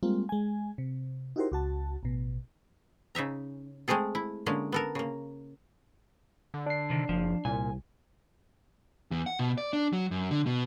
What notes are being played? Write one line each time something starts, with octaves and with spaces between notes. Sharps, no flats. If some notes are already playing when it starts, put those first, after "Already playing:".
G3 G#3 A#3 C4 F4
G#3 G#5
C3
D#4 E4 F#4 G4 A#4 C5
C#2 F#4 A5
A1 B2
C#3 D#4 E5 A#5
G#3 A3 C4 G#4 A4
E4
D3 G#3 A#3 C#4
B3 A4 A#4
C#3 A#3
D3
D4 C7
C3 D#3
F#1 F3
C2 A#2 G#5
E2
F#5
B2
D5
D4
F#3
F#2
D3
B2